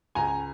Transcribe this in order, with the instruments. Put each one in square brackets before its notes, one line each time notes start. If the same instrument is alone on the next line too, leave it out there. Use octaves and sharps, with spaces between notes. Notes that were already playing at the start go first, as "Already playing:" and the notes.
[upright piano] C#2 G#5 A#5